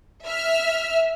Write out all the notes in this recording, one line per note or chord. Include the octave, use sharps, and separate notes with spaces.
E5 F6